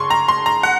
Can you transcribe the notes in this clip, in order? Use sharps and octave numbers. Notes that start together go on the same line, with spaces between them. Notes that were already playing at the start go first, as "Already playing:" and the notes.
Already playing: C#3 C6 C#6
A#5
C6
A#5
F#5